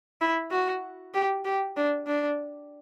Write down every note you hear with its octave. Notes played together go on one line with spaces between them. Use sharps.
E4
F#4
G4
G4
D4
D4